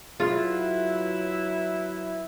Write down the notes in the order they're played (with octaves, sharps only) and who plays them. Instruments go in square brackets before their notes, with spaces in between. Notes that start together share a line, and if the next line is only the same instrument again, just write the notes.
[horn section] F#3 E4 [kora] F4 [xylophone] G#4 [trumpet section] B4 E5